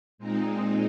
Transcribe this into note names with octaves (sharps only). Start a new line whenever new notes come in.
A#2 G#3 C4 D#4